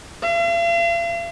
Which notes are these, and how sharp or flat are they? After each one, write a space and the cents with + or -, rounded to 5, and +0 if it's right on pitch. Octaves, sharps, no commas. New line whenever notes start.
F5 -45